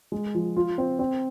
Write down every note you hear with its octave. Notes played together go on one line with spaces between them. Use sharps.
G#3
F3
F4
C4
C4